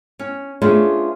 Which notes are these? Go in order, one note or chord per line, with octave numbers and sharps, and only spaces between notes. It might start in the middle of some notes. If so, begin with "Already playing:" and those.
C#4
A3 B3 C#4 D4 F4 G#4